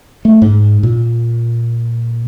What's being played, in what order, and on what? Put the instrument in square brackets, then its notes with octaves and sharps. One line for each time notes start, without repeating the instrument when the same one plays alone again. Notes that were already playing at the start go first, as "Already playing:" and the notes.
[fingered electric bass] A3
G#2
A#2